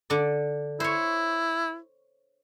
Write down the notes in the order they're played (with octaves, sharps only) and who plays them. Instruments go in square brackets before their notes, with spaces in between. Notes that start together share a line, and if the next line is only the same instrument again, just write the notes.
[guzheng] D3 D5
[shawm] E4 [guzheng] C5 C#5